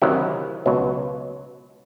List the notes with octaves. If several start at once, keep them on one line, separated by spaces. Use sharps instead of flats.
D2 C3 D#3 F#3 E4
C#2 B2 F#3